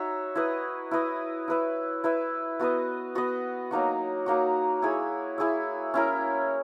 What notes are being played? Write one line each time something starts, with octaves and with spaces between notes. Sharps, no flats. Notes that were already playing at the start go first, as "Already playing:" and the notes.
Already playing: D#4 F#4 C#5 E5
E4 B4 D#5
E4 B4 D#5
E4 B4 E5
E4 B4 E5
B3 F#4 B4 D#5
B3 F#4 B4 D#5
F#3 A#3 D#4 F#4
F#3 A#3 D#4 F#4
E4 G#4 C#5 E5
E4 G#4 C#5 E5
C#4 E4 A#4